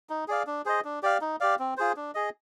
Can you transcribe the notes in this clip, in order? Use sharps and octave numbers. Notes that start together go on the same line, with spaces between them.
D#4
G#4 D5 F5
D4
G#4 C5 D#5
D4
G4 D5 F5
D#4
G4 D5 F5
C4
F4 G#4 C5
D4
G#4 D#5